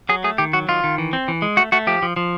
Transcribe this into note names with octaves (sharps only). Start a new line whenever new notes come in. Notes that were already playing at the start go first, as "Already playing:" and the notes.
F#3 G#4
A3 G#4
D#3 G4
F#3 F#4
D#3 F4
D#3
E3
C4
E3
G#3
A3 F#4
A3 F#4
F3 G4
F3
F3